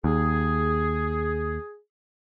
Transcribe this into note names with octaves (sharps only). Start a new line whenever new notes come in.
D#2 G#4